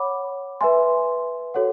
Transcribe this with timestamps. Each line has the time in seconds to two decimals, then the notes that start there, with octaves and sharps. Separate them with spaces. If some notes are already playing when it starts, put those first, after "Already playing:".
Already playing: C#5 F#5 B5 D6
0.61 B4 E5 G#5 C6
1.54 F#4 A4 C#5 F#5